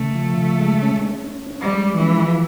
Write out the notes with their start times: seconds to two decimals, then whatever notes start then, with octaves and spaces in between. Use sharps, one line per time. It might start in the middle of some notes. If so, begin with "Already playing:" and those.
Already playing: C#3 A3
0.15 F3
0.38 C#3
0.60 G#3
0.82 C#4
1.05 C#4
1.28 C#4
1.50 C#4
1.61 G3
1.73 G#3
1.94 E3 F3
2.17 F3